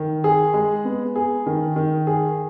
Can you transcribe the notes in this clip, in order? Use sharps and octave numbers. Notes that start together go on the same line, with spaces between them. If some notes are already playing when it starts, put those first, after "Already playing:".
Already playing: D#3
G#4
G#3
B3
G#4
D#3
D#3
G#4